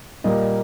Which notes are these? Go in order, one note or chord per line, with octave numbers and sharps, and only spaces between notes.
A#2 G3 A#3 D#5